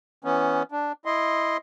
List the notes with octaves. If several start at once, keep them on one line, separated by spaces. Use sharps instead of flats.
E3 B3 C#4
D4
E4 D#5 C6